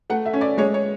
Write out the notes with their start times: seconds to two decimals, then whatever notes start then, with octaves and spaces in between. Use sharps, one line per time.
0.10 A3 F#5
0.26 E5
0.33 C#4
0.41 D5
0.58 G#3 C#5
0.74 C#5